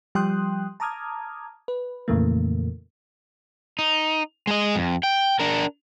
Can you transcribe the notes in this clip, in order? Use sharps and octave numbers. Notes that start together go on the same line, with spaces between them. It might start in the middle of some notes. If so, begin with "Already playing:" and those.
F3 G3 G5 C6 D#6 F#6
A5 A#5 D6 D#6 F6 G#6
B4
F2 A#2 C#3 E3 A3 A#3
D#4
G#3 D#5
F2
G5
D4 A#4